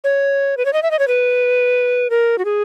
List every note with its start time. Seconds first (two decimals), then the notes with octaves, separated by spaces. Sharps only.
0.04 C#5
0.57 B4
0.65 C#5
0.73 D#5
0.83 E5
0.91 D#5
0.99 C#5
1.08 B4
2.10 A#4
2.38 F#4
2.45 G#4